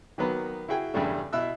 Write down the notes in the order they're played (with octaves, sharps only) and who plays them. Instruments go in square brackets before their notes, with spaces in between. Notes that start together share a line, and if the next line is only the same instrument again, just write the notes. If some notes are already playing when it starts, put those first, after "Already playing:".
[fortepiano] D#3 F#3 A#3 B3 B4
E4 F#4 G#4 G5
E2 G2 C#3 G3 A3
B2 E4 E5 E6 F#6